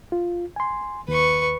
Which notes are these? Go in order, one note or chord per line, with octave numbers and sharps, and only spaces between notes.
F4
G#5 C6
D#2 B4 C#6